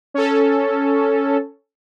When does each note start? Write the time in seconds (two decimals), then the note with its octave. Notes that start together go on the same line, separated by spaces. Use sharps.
0.14 C#4 A4